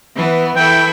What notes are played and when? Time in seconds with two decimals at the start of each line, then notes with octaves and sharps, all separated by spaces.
0.16 E3 B3
0.56 E3 E4 A4 G5